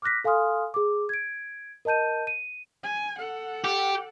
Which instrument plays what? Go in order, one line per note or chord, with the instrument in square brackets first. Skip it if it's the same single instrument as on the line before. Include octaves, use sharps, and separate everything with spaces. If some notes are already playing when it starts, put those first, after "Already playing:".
[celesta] D6 F6 F#6 A#6 B6
A4 F5 G#5 C6 D#6 F6
G#4 D6
G#6 D7
A#4 D#5 A5 G6 D#7
D#7
[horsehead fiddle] G#5
A4 F#5
[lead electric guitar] G4